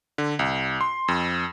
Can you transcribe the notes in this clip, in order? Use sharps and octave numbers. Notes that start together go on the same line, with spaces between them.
D3
C2
C6
F2